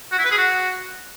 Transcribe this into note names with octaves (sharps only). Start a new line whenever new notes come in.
F#4
E4
B4
G#4
F#4